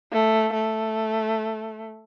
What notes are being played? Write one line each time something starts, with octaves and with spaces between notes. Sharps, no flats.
A3
A3